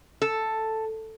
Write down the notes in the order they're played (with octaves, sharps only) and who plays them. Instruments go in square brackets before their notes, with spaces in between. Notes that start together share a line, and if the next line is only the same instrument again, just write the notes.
[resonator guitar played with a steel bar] A4